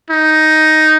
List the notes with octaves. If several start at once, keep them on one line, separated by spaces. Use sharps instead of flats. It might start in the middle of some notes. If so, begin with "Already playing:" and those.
D#4